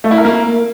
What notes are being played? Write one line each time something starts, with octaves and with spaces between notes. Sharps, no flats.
A3
E4
A#4
A#3